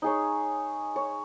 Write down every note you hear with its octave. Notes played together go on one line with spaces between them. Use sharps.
D#4 G#4 C#5
C#5